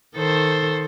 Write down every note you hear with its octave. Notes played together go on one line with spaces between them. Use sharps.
D#3 A4 C5